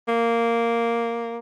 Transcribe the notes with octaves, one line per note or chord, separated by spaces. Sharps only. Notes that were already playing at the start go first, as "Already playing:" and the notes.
A#3